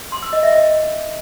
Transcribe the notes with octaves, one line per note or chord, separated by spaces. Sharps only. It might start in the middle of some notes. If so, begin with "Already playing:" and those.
C6
E6
D#5
E5
D#5